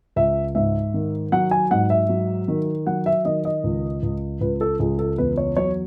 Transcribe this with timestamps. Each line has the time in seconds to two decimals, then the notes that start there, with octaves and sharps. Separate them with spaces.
0.16 C#2 E5
0.55 G#2 E5
0.94 D#3
1.32 F#3 F#5
1.51 G#5
1.71 G#2 F#5
1.90 E5
2.09 F#3
2.48 D#3
2.87 F#3 F#5
3.06 E5
3.25 D#3 D#5
3.45 D#5
3.64 C#2
4.03 C#2
4.41 C#2 B4
4.61 A4
4.80 C#2 G#4
4.99 A4
5.18 E2 B4
5.37 C#5
5.57 F#3 C#5